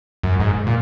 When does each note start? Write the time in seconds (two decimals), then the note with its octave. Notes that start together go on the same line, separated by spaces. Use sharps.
0.23 F#2
0.40 G#2
0.67 A#2